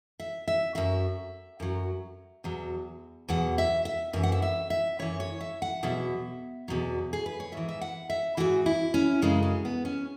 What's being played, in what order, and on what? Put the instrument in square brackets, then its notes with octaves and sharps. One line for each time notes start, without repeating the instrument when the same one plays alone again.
[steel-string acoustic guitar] E5
E5
F#2 F#3 E5
F#2 F#3
E2 B2 F#3
E2 B2 F#3 F#5
E5
E5
F#2 E3 E5
F#5
E5
E5
E5
F#2 E3 C#5
C#5
E5
F#5
E2 B2 F#3 E5
E2 B2 F#3
G#4
B4
C#5
G#2 E3 E5
E5
F#5
E5
G#2 E3 F#4
E4
C#4
F#2 C#3 F#3 G#3
G#3
B3
C#4